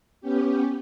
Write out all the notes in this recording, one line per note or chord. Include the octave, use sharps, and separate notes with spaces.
B3 C#4 G4